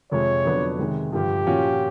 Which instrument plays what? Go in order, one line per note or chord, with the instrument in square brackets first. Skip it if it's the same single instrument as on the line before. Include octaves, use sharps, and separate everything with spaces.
[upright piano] F2 C3 F3 G#3 [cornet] C#5
[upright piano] F2 D3 F#3 B3 D4
C3 D#3 G#3
[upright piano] G2 D3 F3 [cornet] G4
[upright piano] A#2 F3 A#3 C#4 F#4